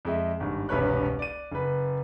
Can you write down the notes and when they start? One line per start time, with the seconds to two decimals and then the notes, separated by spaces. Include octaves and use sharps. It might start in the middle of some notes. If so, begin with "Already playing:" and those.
0.05 F2 G#3 E5
0.40 G#1 G2
0.69 E1 C2 G2 B4 C#5 F#6
1.19 D5 D#7
1.51 F#1 B4